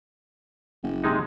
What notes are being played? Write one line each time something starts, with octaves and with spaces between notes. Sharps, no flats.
F#1
C3 G#3 D#4